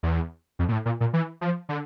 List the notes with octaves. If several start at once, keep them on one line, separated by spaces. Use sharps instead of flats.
E2
F2
A#2
A2
A#2
A#2
E3
F3
D3